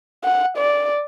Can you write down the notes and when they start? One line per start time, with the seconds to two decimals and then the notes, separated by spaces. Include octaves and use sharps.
0.24 F#5
0.58 D5